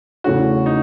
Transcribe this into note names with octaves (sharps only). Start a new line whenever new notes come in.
E2 C#3 E3 A3 C#4 F#4
D#4